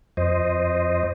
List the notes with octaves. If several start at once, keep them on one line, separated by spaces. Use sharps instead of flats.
F2 C5 D#5